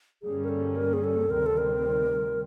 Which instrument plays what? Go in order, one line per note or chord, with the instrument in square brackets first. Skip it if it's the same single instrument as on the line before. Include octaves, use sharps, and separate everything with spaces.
[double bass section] G2 D3 G3 A#3 C#4 [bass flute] G#4
[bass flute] A#4
A4
A#4
G#4
A4
[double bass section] D2 C3 D#3 G3 C4 [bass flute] A#4
[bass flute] A4
A#4